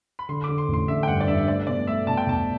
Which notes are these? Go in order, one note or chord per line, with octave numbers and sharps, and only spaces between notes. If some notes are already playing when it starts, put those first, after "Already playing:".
B5
D3 C6
D6
D3
C6
A1
C6
D3 E5
G5
G2 F#5
D5
G2 E5
E5
A3 D5
B2 D5
A3 E5
B2 A5
G5
B1 A5